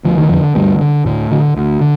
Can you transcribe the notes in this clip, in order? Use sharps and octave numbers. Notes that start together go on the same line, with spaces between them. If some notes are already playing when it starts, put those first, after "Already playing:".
D2 F3
D#3
F2 D3 F3
D2 G2 G3
D3
D2 A2 A3
D3
D2
D3